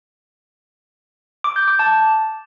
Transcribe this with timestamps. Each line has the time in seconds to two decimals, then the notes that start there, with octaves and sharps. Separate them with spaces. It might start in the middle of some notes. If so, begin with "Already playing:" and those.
1.44 D6
1.56 G6
1.68 D6
1.79 A5